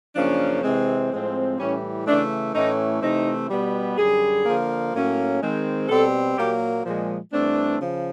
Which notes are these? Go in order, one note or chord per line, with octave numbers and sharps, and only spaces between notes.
F#2 C#3 F3 A#3 C#4 D4
C3 E3 G#3 C4
A2 F3 G#3 C4
A2 E3 G3 C#4
C#3 E3 A3 D4
A2 E3 A3 C#4 D#4
C3 E3 A3 C4 D#4
B2 G3 B3
F#2 D3 G3 G#4
D3 F3 A#3
A2 F#3 A#3 C#4
D#3 G#3 C4
B2 G3 C4 A4
A#2 F#3 A#3 G4
A#2 F3 G#3
G2 E3 A3 C4 D4
C#3 F3